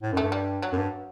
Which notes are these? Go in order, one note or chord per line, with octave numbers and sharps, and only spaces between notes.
A2
F#2 A3
G2
G3
F#3
F#2
G2